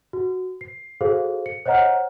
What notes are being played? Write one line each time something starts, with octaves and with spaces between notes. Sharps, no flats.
F#4
C7
F#4 G#4 A4 C5 F5
C#7
C5 C#5 D#5 F#5 A#5 F6